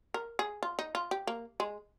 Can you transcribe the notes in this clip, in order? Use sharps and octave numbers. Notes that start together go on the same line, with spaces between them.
A#4
G#4
F4
D#4
F4
G4
A#3
G#3